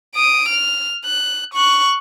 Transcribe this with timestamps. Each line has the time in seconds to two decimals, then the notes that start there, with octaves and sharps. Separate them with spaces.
0.16 D#6 D7
0.48 F6
1.05 F#6
1.54 C#6 F#6